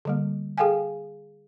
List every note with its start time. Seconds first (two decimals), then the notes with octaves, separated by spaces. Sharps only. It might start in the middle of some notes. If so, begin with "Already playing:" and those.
0.05 D3 G3 A#3
0.58 G#4 A4 F5 G5 G#5